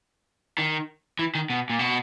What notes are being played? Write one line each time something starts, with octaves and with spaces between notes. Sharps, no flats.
D#3
E3
D#3
B2
A#2
B2